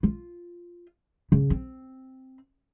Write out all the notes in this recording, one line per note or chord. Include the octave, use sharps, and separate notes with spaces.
F4
C#3
C4